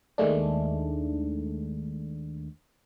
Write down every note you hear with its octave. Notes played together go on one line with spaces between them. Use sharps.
D#2 D#3 G#3 A3 D4